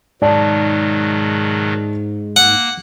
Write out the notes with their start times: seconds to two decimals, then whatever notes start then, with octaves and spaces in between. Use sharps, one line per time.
0.22 G#2 B2 D#3 F#3 D5 A5
2.36 A#3 F#5 E6